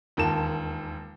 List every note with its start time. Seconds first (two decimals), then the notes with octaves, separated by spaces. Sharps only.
0.17 E1 D#2 F4 A#4 A5 E7